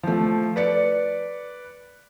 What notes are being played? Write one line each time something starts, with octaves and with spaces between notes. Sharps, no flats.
F3 A3
B4 D5 C#7